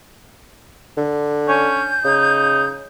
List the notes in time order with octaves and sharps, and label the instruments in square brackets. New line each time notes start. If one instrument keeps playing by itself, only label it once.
[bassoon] D3
[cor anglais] C#4 [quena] G6
[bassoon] C#3 [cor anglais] D#4